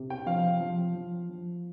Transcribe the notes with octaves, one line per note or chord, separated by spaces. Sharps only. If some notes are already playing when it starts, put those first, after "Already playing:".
Already playing: C3
G5
F3 F5
F3
F3
F3